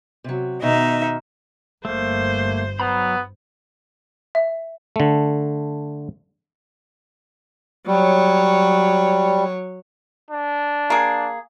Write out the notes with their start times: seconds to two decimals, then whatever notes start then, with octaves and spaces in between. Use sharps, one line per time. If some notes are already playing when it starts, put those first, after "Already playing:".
0.24 C3 F#3
0.62 B2 D#3 D#4 E5
1.85 G1 G2 A3 A#3 C5
2.80 F#3 B3 A#5 B5
4.35 E5
4.96 D3 A3
7.87 F#3 G3 C#5
10.31 D4
10.90 A#3 G#4